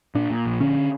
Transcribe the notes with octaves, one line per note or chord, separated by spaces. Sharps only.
A#2 D4
A#2
A#1
D3 C#4